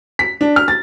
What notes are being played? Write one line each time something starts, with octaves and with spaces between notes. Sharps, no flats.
B6
D4
F6
A6